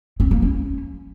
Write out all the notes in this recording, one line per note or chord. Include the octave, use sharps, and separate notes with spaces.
C4
A#3
C#4